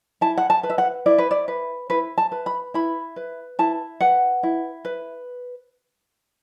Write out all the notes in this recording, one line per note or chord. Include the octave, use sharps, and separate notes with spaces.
E4 A5
F#5
A5
B4
E5
F#5
E4 D5
B4
D5
B4
E4 B4
A5
B4
B5
E4 B5
B4
E4 A5
B4 F#5
E4
B4